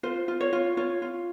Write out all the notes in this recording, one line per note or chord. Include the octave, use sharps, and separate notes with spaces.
F4 C5
F4
C#5
F4
F4 C#5
F4